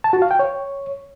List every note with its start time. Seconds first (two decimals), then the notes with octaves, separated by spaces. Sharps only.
0.04 A5
0.13 F#4
0.22 F5
0.31 G5
0.39 C#5